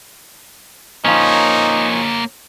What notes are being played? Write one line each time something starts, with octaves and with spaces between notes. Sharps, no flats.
F3 A#3 C#4 D#4 C#5